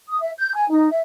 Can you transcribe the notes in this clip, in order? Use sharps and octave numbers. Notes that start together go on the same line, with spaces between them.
D#6
E5
G6
G#5
D#4
E5